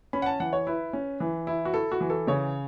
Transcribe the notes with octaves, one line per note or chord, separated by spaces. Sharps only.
C#4 B5
F#5
A5
E3 F#5
C#5
E4 B4
C#4
E3
E4
F#4
E4 A4
F#4
E3
A4
C#3 C#5